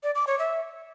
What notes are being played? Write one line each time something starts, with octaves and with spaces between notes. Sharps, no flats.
D5
D6
C#5
E5